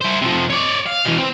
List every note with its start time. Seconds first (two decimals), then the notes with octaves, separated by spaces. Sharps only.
0.01 E4 C5
0.22 C3 F3
0.50 C#5 D5
0.86 F5
1.06 B2 E3
1.18 C4